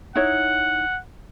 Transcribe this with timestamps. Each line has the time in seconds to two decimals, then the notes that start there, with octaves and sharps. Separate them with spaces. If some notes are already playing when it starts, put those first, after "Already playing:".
0.15 D#4 E4 C#5 F#5